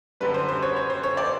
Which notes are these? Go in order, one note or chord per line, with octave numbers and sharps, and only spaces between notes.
F#2 D3 G3 B4
C5
C5
C#5
C#5
C5
C#5
D5